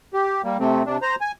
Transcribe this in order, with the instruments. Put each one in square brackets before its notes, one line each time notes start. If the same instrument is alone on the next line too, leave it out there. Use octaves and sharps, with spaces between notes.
[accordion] G4
G3 A#3
C3 A3 C4
C3 D4
C5 A#5
G#5